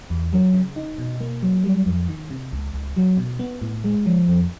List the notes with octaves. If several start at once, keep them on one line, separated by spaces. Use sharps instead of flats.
E2
F#3
C#3
D#4
B2
A#3
F#3
G3
F2
D#3
C3
C#2
C#2
F#3
B2
B3
A2
G#3
F3
F2